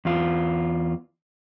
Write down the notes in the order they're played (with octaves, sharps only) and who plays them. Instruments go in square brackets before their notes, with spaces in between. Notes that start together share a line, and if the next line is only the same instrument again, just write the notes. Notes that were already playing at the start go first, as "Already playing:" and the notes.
[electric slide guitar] E2 F4